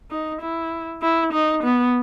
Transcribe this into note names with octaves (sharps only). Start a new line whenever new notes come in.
D#4
E4
E4
D#4
B3